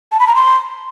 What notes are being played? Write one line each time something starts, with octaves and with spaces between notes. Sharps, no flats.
A5
B5
A#5
C6